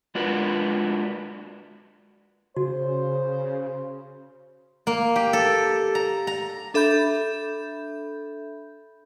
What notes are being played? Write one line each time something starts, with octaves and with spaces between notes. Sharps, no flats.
G#3 D4 F4 F#4 A#4 B4
C#3 F#4 C5
A#3
G4
A4
A#5
A#5
D4 A4 E5 B5 G6